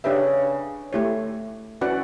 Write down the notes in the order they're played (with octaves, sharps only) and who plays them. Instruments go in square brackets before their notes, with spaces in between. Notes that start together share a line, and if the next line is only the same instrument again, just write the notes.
[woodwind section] C#3 [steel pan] D4 G4 B4 E5
[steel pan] A3 E4 G4 C#5
[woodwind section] E3 [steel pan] C#4 F#4 B4 D5 F#5